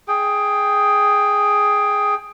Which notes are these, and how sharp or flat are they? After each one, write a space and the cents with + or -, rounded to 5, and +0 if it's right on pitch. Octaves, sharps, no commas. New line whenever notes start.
G#4 +0 G5 +10